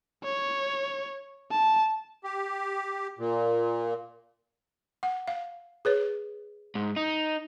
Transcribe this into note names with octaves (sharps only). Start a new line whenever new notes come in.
C#5
A5
G4
A#2
F#5
F5
G#4 B4 C#5
G#2
D#4